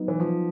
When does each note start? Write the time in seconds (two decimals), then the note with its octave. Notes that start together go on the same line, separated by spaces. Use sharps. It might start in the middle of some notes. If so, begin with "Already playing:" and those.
Already playing: F#3 B3 D#4
0.08 E3
0.20 F3